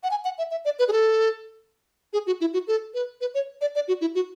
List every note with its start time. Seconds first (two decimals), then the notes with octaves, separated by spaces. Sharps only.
0.03 F#5
0.11 G#5
0.25 F#5
0.38 E5
0.51 E5
0.65 D5
0.79 B4
0.88 G#4
0.92 A4
2.13 G#4
2.27 F#4
2.41 E4
2.53 F#4
2.67 A4
2.94 B4
3.21 B4
3.34 C#5
3.61 D5
3.75 D5
3.88 F#4
4.01 E4
4.15 F#4